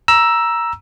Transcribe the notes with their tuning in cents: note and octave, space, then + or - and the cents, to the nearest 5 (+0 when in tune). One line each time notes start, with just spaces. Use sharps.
A#5 +15 E6 +5